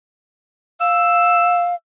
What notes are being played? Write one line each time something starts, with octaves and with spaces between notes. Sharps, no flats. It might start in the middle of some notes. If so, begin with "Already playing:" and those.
F5 E6